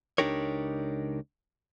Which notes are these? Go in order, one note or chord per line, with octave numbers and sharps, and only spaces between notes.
C#2 D4 D#4 G4 A#4 C#5